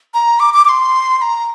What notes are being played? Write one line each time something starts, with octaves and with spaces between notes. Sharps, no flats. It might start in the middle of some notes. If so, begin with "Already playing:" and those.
A#5
D6
D6
D6
C6
C6
A#5